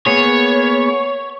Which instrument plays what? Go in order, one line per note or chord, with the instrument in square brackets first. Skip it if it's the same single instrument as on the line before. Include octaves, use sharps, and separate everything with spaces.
[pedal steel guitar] A#3 B3 G#4 [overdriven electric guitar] C#5